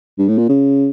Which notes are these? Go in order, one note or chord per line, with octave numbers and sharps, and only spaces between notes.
G2
A2
A#2
C#3